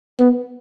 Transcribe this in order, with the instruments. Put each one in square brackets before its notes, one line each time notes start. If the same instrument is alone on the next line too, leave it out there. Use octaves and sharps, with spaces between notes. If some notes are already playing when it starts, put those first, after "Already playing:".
[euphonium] B3